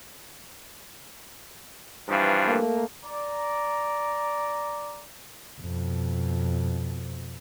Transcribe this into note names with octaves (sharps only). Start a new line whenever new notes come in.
G2 E3 F3
A3 A#3
D5 A#5
F2 B2